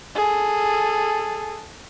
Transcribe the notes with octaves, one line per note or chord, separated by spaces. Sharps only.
G#4 A4